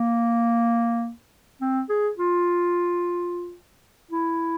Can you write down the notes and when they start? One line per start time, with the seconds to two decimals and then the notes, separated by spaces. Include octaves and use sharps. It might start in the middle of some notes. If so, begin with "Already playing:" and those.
Already playing: A#3
1.61 C4
1.89 G#4
2.17 F4
4.11 E4